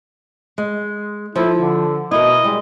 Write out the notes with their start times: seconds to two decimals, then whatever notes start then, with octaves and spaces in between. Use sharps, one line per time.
0.58 G#3
1.36 F3 E4 A4 C5
1.57 D3
2.11 B2 E4 A#4 D#5
2.44 G3 G#3